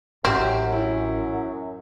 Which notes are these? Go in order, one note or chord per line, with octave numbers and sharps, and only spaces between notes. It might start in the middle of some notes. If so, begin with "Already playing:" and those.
A1 F#2 C4 G4 F#5
E4